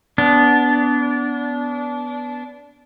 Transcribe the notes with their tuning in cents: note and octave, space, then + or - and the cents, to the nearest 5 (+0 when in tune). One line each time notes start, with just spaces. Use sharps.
B3 +0 D4 -25